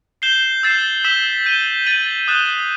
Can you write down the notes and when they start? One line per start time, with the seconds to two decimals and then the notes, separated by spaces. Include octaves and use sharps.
0.22 G6 C7 E7 G7
0.63 E6 A6 C7 E7
1.04 E6 B6 E7 G7
1.45 G6 D#7 G7
1.86 A6 D#7 F#7
2.28 D#6 F#6 A6 E7 G7